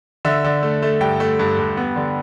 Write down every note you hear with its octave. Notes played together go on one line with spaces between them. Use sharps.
D3 E5
D3
A3
A3
G2 G5
A3
G2
G2
B3
D3